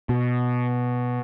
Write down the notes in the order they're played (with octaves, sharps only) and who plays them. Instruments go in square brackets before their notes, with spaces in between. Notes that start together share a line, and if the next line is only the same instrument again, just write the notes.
[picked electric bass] B2